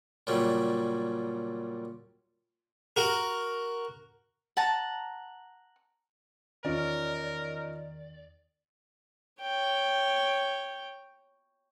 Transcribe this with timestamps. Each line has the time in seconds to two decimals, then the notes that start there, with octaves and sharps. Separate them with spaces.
0.27 A#2 C#3 F#3 G3 A3
2.96 F#4 A#4
4.57 F#5 A5 A#5
6.65 E2 D#3 C#4 D#4 F4 A#4 D5
9.41 C#5 G5